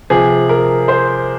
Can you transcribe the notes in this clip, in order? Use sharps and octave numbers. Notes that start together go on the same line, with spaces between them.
C3 F3 G#4
A#4
C5